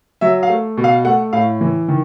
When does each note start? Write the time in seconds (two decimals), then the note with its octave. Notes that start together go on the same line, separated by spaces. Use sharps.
0.21 F#3 E5
0.43 F5
0.49 A3
0.77 B2
0.84 F5
1.05 A3 F#5
1.33 A2 F5
1.61 E3
1.88 D#3